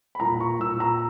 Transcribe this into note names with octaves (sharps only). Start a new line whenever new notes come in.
B5
A#2 A#5
C#6
A#2 E6
A#5